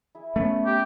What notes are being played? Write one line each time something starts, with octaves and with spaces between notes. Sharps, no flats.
E4 G#4 E5
A3 B3 C#4
G4